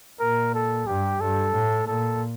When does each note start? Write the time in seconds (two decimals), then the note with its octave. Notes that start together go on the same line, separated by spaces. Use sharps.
0.20 A#2 A#4
0.55 A4
0.87 G2 G4
1.21 G2 A4
1.54 A2
1.87 A#2 A4